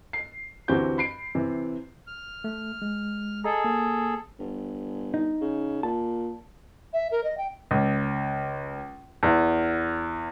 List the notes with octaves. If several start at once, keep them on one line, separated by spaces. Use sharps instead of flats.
C7
D2 E3 C4 F#4 G4 G6
B5 C7 D7
C3 E3
F6
A3
G#3
G#4 A4 D#5 A#5
A#3
G1
D#4
C#3
A#2 A5
E5
A#4
D#5
G5
C#2
E2